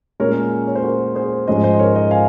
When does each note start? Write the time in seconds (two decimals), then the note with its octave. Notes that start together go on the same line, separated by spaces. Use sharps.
0.20 A#2 G#3 C#4 A#4 C#5
0.67 C#5
0.75 C5
0.83 F#4 A#4
1.15 G#4 C5
1.47 G#2 F3 G#3 C#4 C5 D#5
1.63 C5 D#5
1.79 A#4 C#5
1.96 C5 D#5
2.11 F5 G#5